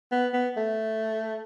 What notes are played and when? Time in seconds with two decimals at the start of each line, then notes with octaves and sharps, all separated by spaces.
0.12 B3
0.34 B3
0.57 A3